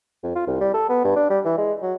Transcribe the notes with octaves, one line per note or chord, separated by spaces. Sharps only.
F2
F4
C2
G3
A4
B3
G2
D4
G3
E3
G#3
F#3